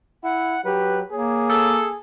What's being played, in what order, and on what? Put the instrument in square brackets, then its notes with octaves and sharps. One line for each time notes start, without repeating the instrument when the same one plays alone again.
[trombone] E4 [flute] F#5
[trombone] F#3 [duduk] G4 [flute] B4
[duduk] A#3 [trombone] G#4 [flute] C#5
[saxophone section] A4